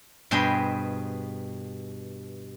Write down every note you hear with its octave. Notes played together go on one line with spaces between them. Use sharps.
G2 B2 G#4 C5 D#5 G5